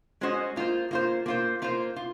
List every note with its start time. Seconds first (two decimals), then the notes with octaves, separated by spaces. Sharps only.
0.21 G#3 C#4 F#4 C5 D#5
0.56 A#3 F4 C5
0.91 A#3 F4 C5
1.26 A#3 F4 C5
1.62 A#3 F4 C5
1.96 F4